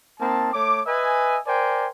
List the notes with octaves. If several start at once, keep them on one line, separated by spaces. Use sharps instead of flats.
A#3 C4 D#4 A5
A3 C#5 D6
B4 D#5 E5 G#5
A#4 C5 D5 G5 G#5